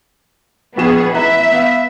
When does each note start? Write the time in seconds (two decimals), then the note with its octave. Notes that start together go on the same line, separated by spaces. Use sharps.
0.77 A#1 B3 F#4 G#4 E7
1.14 A1 B4 E5 A#5
1.52 B3 F5